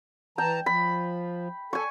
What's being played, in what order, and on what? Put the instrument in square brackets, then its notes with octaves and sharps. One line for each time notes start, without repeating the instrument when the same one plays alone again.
[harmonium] E3 A5 A#5 [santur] G5
[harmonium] F3 [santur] B5
[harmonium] A4 [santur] G#5 C#6